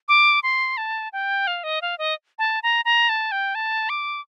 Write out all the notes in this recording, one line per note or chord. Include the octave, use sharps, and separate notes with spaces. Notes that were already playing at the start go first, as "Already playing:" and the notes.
D6
C6
A5
G5
F5
D#5
F5
D#5
A5
A#5
A#5
A5
G5
A5
D6